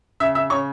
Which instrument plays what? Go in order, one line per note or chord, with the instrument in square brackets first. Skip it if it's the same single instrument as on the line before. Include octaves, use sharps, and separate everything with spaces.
[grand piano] C#3 E5 E6
E5 E6
C#3 C#5 C#6